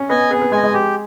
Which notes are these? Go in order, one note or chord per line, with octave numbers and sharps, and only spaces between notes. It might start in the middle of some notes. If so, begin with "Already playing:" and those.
Already playing: C#4
B3 D#5 G#5
B3 G#4
B3
G#3 D#5 G#5
G#3
G4